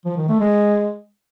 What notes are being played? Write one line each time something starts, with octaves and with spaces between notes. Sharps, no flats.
F3
D#3
A3
G#3